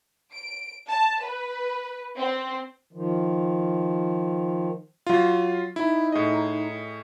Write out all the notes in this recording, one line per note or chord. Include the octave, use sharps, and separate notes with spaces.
D7
A5
B4
C4
D#3 F3
F#3 F4
D#4 E4
A2 G#4 D#5